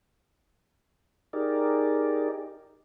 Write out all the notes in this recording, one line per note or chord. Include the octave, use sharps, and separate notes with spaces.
D#4 G4 G#4 A#4 D5